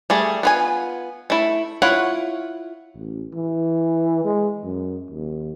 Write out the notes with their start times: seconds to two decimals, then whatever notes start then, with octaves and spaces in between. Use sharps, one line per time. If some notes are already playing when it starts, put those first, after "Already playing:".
0.10 G3 A3 G#4
0.43 B3 F4 G#5
1.30 A3 E4
1.82 E4 F4 C#5 F#5
2.97 A1
3.34 E3
4.25 G#3
4.64 F#2
5.11 D#2